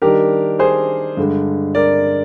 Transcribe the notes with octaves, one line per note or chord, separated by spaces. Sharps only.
D#3 G3 D4 G4 A#4
G#4 C5
G2 D3 G#3
A#4 D5